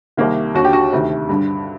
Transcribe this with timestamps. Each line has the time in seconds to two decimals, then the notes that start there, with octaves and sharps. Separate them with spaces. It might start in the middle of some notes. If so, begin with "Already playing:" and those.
0.17 C2 C3 D#3 A#3
0.55 D#2 D3 F#4
0.64 G4
0.73 F#4
0.93 D2 C3 D#3
1.29 G2 D3